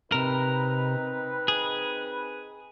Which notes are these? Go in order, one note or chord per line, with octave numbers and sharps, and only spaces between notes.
C3 C4 D#4 A#4 B4
G#4